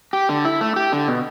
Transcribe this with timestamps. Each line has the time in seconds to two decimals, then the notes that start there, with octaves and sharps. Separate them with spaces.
0.13 G4
0.29 D3
0.45 E4
0.61 A3
0.76 G4
0.92 D3
1.08 B2